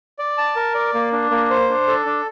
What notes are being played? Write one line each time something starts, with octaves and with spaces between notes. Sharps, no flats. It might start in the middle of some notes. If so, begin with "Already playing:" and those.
D5
A5
A#4
D5
A#3
D4
A#3
C5
D4
A4
D4